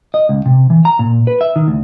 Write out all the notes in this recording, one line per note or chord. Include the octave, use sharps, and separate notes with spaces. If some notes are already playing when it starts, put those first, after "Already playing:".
D#5
C#2
C3
E3
A#5
A#2
B4
E5
D#3
D2